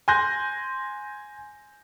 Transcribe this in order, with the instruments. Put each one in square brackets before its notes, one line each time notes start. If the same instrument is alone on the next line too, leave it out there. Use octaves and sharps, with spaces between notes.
[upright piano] G#5 C6 F#6 G6 A#6